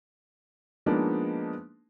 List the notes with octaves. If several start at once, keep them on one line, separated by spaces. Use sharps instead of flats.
F3 G#3 A#3 B3 D4 D#4